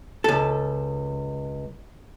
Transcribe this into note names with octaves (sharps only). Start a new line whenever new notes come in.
C#2 A4